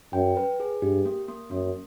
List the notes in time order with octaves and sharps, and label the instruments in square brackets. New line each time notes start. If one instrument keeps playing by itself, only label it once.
[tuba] F#2 [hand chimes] G5
[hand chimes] B4
G#4
[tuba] G2 [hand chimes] G4
[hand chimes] A#3
A#3
[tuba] F#2 [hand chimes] A#3